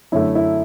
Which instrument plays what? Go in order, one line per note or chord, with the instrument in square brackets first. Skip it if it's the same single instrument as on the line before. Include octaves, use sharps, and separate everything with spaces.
[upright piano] F#2 D3 A3 E4
E4